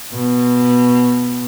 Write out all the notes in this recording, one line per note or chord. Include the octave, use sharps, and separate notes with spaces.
B2